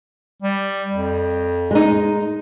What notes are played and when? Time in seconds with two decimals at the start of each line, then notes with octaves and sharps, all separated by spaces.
0.42 G3
0.94 F2
1.71 G#3 D#4